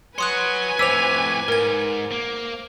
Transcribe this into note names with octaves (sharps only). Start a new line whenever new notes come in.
F#4 B4 C#5 G#5 C6 D#6 F#6
F2 A2 C5 D6 E6 B6 F7
G#2 A#4 G#6
A#3